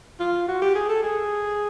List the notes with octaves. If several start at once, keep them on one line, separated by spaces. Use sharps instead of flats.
F4
F#4
G4
G#4
A4
G#4